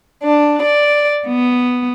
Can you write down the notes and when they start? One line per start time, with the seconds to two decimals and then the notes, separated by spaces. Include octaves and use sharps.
0.22 D4
0.61 D5
1.27 B3